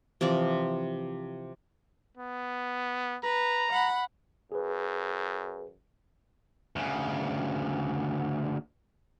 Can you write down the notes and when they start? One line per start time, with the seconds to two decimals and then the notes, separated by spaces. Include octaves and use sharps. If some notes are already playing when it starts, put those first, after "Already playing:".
0.21 C3 E3 F3 D5
2.17 B3
3.24 B4 A#5
3.72 F#5 B5
4.52 F#2 G#4 B4
6.76 D2 C#3